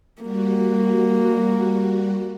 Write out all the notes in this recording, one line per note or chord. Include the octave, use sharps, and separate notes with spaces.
G3 A#3 F#4